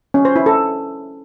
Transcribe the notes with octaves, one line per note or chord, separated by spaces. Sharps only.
C#4
C5
E4
A4